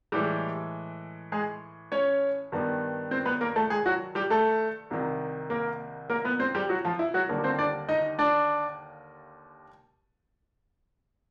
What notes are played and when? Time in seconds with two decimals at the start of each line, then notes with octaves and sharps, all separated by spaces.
0.12 A2 E3 G3 G#3 G4
1.32 G#3 G#4
1.92 C#4 C#5
2.52 G2 D#3 G3 B3
3.11 C4 C5
3.26 B3 B4
3.41 A#3 A#4
3.56 A3 A4
3.70 G#3 G#4
3.86 F#3 F#4
4.15 G3 G4
4.30 A3 A4
4.90 C2 C3 D#3
5.50 A#3 A#4
6.10 A#3 A#4
6.25 B3 B4
6.39 C4 C5
6.55 G3 G4
6.69 F#3 F#4
6.85 F3 F4
6.99 E4
7.14 F#3 F#4
7.29 D#2 D3 G3 A#3
7.44 C4 C5
7.59 D4 D5
7.89 D#4 D#5
8.19 D4 D5